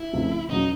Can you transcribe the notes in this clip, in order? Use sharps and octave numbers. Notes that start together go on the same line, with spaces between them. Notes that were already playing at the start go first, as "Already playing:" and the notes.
Already playing: E4
C#2 C#3 F3 A3 C4
E2 C#3 F#3 D#4